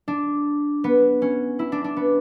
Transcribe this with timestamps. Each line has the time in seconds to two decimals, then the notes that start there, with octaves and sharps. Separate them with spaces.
0.08 D4
0.84 B3
1.22 C#4
1.59 E4
1.72 D4
1.84 D4
1.96 B3